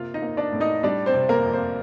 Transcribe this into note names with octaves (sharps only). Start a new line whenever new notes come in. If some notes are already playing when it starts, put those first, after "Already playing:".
Already playing: C3 A#3 F4 F5
D#4 D#5
A#3
D4 D5
A2
D#4 D#5
G3 D4 D5
C4 C5
C3
A#3 A#4
F2
C4 C5